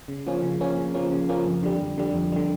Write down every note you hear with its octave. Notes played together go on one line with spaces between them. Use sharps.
C#3
F3 A#3 C#4
C#3
F3 A#3 C#4
C#3
F3 A#3 C#4
C#3
F3 A#3 C#4
F2
D3 G3
F2
D3 G3
F2
D3 G3